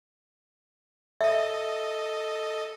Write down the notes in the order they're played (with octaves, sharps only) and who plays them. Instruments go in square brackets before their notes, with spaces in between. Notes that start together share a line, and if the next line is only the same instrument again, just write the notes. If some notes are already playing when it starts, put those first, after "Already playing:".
[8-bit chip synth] A4 D#5 [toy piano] E5